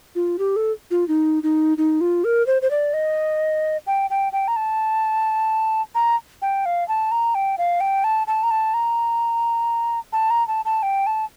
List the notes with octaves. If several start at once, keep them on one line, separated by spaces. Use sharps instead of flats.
F4
G4
A4
F4
D#4
D#4
D#4
F4
A#4
C5
C5
D5
D#5
G5
G5
G5
A#5
A5
A#5
G5
F5
A5
A#5
G5
F5
G5
A5
A5
A#5
A5
A#5
A5
A#5
A5
A5
G5
A5